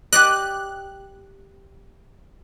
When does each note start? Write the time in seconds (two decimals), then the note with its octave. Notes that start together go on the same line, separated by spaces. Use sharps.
0.13 G4 D5 D#5 F#6